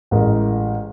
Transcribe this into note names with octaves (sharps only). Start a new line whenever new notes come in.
A1 G#3 A#4